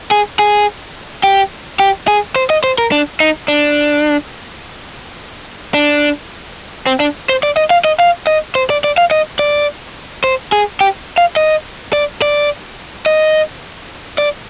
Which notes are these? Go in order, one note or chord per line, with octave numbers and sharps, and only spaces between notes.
G#4
G#4
G4
G4
G#4
C5
D#5
C5
A#4
D4
D#4
D4
D4
C4
D4
C5
D5
D#5
F5
D#5
F5
D#5
C5
D5
D5
F5
D#5
D5
C5
G#4
G4
F5
D#5
D5
D5
D#5
D5